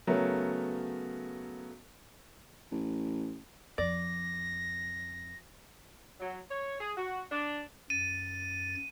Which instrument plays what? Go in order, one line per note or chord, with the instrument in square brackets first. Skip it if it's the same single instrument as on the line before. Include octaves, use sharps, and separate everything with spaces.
[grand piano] C#3 F#3 A3 B3 A#4
[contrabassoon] A1
[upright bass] F2 [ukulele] D5 [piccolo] A#6
[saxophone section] F#3
C#5
G#4
F#4
D4
[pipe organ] F#2 A6 [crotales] D#7